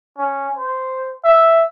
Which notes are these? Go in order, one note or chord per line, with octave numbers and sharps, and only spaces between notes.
C#4
C5
E5